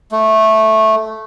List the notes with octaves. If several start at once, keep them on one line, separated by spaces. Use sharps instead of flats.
A3